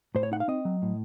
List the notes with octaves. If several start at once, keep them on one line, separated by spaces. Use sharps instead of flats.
A2 C5
C#5
D#4 F#5
F5
C4 D#5
F#3
A2